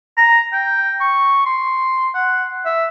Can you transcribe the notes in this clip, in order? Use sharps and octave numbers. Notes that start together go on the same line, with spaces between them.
A#5
G5
C#6
C6
F#5
E5